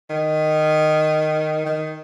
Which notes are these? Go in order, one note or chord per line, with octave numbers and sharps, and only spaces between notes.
D#3
D#3